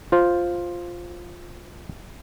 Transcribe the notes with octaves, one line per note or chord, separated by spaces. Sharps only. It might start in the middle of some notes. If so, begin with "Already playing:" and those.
F4 C5